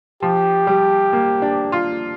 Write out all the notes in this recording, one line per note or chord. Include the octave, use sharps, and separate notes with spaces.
F3 G4
G3
A#3
D4
F4